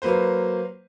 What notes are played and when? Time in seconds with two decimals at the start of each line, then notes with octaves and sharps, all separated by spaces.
0.02 F#3 A#3 B4 C5